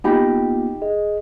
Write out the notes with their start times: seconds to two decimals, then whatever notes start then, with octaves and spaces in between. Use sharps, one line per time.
0.04 A#3 B3 D#4 F4 G4 B5
0.82 G#4 D#5